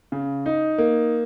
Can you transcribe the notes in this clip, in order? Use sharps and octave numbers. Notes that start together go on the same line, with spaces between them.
C#3
D#4
A#3